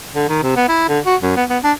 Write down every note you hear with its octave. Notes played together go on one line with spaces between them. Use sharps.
D3
D#3
C3
B3
E4
D3
F#4
F#2
B3
B3
D4